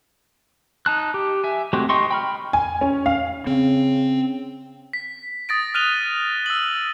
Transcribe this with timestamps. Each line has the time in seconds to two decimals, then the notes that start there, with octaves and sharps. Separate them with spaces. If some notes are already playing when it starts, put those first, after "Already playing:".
0.86 D#4 A5 F#6
1.14 G4
1.44 E5 G#5
1.73 G#3 A3 C4 F#4 G4
1.89 D#4 D#5 G5 C6 C#6
2.11 G5 B5 F6
2.53 G#5
2.81 C#4
3.06 F5
3.47 C#3 C4
4.93 B6
5.49 D#6 A6 A#6 D7
5.74 F6 F#6 D#7 F7 G7
6.46 E6 F#7